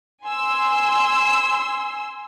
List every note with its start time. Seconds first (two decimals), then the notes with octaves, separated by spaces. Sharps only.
0.24 G#5 C6 E6